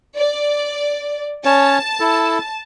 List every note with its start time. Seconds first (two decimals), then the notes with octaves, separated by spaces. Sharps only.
0.18 D5
1.45 C#4 C#5 A5
2.00 E4 A4